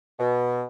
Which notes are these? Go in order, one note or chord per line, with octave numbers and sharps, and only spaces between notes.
B2